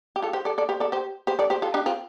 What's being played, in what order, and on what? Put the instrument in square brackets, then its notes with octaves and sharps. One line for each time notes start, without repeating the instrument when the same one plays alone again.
[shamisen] G4
F4 A4
G4 C5
A4 D5
A4 D5
G4 C5
A4 D5
G4 C5
G4 C5
A4 D5
G4 C5
F4 A4
D4 G4
C4 F4